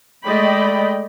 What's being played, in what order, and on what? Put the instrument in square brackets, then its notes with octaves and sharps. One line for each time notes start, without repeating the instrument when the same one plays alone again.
[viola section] G#3 A3 D5 D#5 G5 B5